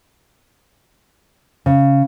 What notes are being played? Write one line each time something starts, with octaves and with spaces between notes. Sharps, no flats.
C#3